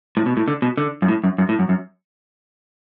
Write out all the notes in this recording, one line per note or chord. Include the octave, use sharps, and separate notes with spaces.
A2
B2
A2
D3
B2
D3
F#2
A2
F#2
F#2
A2
F#2
F#2